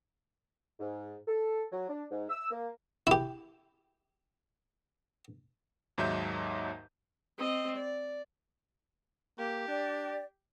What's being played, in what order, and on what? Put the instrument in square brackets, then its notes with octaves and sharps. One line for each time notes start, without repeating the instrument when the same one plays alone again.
[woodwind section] G#2
A4
F#3
D4
G#2
E6
A#3
[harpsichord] E4 G4
[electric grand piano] D#2 G#2 F#3 D#4 E5 G6
[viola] C4 D#5
D5
[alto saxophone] A#3 [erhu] G4
[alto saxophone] D4 [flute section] D5 G5